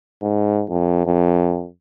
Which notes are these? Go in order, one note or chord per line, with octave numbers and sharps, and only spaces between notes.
G#2
F2
F2